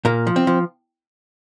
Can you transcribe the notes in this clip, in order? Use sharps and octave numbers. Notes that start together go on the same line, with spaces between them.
A#2 A#3
F3
C4
F3